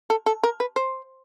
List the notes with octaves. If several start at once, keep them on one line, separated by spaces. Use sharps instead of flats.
A4
A4
A#4
B4
C5